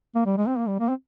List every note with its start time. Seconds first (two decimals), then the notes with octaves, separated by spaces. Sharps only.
0.15 A#3
0.26 G3
0.37 G#3
0.48 C4
0.58 A#3
0.68 G3
0.79 A#3
0.89 C4